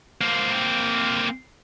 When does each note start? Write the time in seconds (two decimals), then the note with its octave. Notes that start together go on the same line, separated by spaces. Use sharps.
0.21 A#3 C4